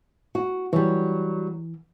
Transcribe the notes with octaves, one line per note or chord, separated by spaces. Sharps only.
F#4
E3 F#3 G3